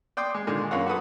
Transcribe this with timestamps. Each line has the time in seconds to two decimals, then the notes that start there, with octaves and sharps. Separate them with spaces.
0.17 D5 G5 C6 D#6
0.35 G#3
0.47 A#2 D3 D#3 G#3
0.71 F#2 A#3 F4 C#5 F#5
0.86 F#4 A4 B4 D#6